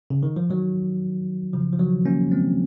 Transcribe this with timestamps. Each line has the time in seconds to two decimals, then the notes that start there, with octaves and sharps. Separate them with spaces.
0.10 C#3
0.23 D#3
0.36 F3
0.49 D#3 F#3
1.53 C#3 F3
1.73 F3
1.79 D#3 F#3
2.05 A#3 C#4
2.32 G#3 C4